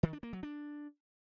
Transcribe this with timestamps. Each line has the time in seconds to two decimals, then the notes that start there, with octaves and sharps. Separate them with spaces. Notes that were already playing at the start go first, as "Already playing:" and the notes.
0.03 D#3
0.13 D4
0.23 A#3
0.33 F#3
0.43 D4